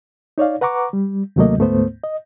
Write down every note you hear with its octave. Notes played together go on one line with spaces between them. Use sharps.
D#4 C#5 D5 F5
B4 F#5 A#5 C#6 D6
G3
D#2 C3 F#3 A3 A#3 D#5
D2 G#2 A3 B3 C5
D#5